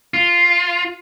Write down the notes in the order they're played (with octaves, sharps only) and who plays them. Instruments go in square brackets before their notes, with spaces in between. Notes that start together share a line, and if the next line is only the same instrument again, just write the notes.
[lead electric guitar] F4